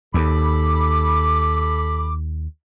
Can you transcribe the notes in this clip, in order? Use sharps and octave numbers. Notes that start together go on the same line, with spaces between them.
D#2 A4 B5 D6